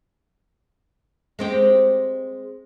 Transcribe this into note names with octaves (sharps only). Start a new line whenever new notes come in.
G#3 C4 G4